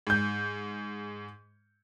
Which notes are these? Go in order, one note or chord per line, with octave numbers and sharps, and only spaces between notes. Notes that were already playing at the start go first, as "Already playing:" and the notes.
G#2 G6